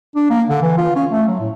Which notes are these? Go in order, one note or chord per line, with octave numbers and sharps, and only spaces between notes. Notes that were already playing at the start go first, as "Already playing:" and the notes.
D4
A#3
D3
E3
F4
C#4
A3
F#3
A2